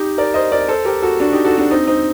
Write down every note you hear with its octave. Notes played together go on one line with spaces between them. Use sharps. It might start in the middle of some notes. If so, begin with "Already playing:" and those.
Already playing: D#4 G4
A#4 D5
C5 D#5
A#4 D5
A4 C5
G4 A#4
F#4 A4
D4 F#4
D#4 G4
F#4 A4
D4 F#4
C4 D#4
C4 D#4